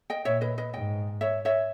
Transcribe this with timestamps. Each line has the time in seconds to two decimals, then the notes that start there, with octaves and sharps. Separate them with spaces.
0.10 D#5 G5
0.25 A#2 C#5 E5
0.41 B4 D#5
0.58 B4 D#5
0.73 G#2 D#5 G5
1.21 C#5 E5
1.45 C#5 E5